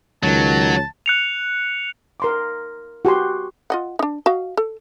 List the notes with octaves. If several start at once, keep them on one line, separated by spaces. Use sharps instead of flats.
C#2 D#3 F#3 A5
F#6 C#7 F7
A#4 C6 D6
F#4 G4 G#5 C6
F4 D#5 F#5
D4 D#4
F#4 D#5 F5
A4